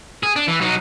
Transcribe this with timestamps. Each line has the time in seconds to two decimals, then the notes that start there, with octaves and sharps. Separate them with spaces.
0.23 G#4
0.36 D4
0.48 E3
0.61 F#3 D#4